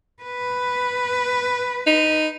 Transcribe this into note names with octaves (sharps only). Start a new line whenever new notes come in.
B4
D#4